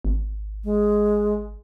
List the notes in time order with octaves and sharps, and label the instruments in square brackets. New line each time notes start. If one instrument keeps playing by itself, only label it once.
[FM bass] G#1
[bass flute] G#3